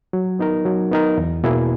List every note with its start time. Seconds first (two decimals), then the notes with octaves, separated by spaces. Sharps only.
0.13 F#3
0.39 B3 D#4 A#4
0.65 F#3
0.91 B3 D#4 A#4
1.18 E2
1.44 B2 A#3 E4 G#4